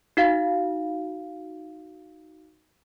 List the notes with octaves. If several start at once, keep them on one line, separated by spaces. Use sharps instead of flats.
D#4 F#4 F5